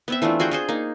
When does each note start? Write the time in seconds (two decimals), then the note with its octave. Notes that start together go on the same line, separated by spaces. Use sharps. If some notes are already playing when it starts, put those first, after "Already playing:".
0.08 B3 C4 E5
0.22 E3 A3 D4 F4
0.40 F4 F#4 G#4 G5
0.51 F4 G#4 C5
0.69 A#3 D#4